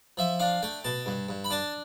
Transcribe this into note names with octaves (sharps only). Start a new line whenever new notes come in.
F3 E5
D4 F5
A3 G5
B2 A5
G2
G2
B5
D4 A5